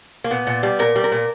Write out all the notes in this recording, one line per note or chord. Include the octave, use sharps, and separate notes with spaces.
A#3
A#2 B3
A#2
G3
A#2 A#4
G3
A#4
A#2